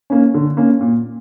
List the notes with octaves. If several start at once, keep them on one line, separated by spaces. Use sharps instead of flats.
A#3 C#4
D3
A#3 C#4
A#2